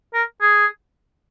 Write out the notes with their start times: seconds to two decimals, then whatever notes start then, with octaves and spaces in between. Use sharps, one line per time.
0.14 A#4
0.41 G#4